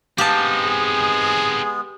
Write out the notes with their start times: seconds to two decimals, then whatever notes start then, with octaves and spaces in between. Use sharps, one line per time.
0.18 G#3 B3 C4 D#4 G4 F5 A5
0.64 G#4